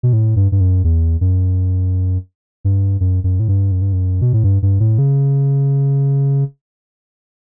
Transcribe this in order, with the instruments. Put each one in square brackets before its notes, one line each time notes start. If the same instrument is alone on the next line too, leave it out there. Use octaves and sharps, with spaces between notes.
[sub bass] B2
A2
G2
G2
F#2
E2
F#2
G2
F#2
F#2
A2
G2
F#2
G2
F#2
B2
A2
G2
G2
A2
C#3